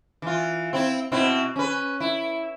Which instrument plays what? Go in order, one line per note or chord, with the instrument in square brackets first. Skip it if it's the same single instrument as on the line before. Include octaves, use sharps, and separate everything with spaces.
[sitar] E3 F4
C4 E4
B2 C4 E4
C#4 B4
E4